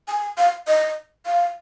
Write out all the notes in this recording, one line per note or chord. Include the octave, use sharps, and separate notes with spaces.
G#5
F5
D#5
F5